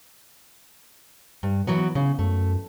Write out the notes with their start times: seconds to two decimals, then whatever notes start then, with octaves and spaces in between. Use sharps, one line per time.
1.43 G2
1.67 E3 F#3 B3
1.95 C#3
2.19 F#2 A3